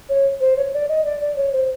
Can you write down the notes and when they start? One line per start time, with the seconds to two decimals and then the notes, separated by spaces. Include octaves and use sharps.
0.09 C#5
0.40 C5
0.57 C#5
0.74 D5
0.89 D#5
1.05 D5
1.20 D5
1.36 C#5
1.53 C5